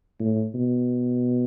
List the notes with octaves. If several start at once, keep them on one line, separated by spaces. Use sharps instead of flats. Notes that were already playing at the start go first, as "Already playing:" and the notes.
A2
B2